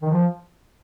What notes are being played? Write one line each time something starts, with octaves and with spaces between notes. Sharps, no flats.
D#3
F3